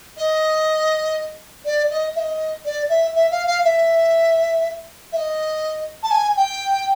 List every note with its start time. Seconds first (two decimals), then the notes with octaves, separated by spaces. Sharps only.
0.17 D#5
1.65 D5
1.91 D#5
2.15 E5
2.20 D#5
2.66 D5
2.89 E5
3.15 E5
3.31 F5
3.47 F5
3.64 E5
5.12 E5
5.17 D#5
6.03 A5
6.11 G#5
6.37 G5